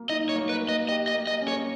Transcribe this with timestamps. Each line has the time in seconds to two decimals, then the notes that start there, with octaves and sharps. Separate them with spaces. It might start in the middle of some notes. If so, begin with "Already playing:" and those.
Already playing: A#3
0.09 D#4 D#5
0.29 C#5
0.36 A#3
0.49 B4
0.62 A#3
0.69 D#5
0.88 G4 D#5
1.08 D#5
1.15 A#3
1.27 D#5
1.41 C#4
1.48 C#5